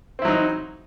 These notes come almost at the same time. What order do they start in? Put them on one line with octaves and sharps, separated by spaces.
C4 E4 F#3 D#4